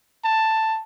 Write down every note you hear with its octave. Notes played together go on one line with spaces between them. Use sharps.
A5